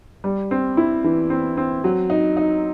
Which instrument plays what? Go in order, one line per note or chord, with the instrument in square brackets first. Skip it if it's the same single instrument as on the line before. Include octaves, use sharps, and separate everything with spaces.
[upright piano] G3
C4
E4
E3
C4
C4
F#3
D#4
D#4